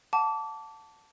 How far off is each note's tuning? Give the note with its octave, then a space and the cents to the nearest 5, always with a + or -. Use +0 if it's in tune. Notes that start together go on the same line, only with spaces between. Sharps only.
F#5 +0 A5 +5 D6 -25